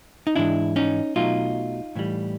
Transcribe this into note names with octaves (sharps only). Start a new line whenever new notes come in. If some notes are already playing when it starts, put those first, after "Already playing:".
D#4
G#2 E3 G#3 D4 E4
C#4 D#4
B1 B2 F#3 A3 D#4 F4
A2 E3 G3